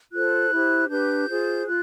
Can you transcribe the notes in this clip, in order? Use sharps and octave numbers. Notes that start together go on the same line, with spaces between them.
F4 A4 C5 F#6
E4 G4 C5
D4 G4 B4 G6
F4 G#4 C5
F4 F#6